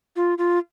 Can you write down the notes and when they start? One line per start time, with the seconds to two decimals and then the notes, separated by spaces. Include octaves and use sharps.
0.16 F4
0.38 F4